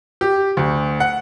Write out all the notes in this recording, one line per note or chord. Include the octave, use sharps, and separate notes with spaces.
G4
D2
F#5